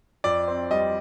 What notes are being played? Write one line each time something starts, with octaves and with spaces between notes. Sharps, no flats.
F2 D5
C4
G3 D#5